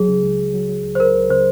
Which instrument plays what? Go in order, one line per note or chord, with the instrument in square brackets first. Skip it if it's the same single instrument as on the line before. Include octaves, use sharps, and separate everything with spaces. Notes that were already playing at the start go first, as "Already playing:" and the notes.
Already playing: [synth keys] C#2 F#3 [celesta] G#4
[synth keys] C#3
C#2
C#2
F#3
F#3
C#2
[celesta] C5
[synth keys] C#2 [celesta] A#4
[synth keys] C#2
[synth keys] C#3 [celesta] C5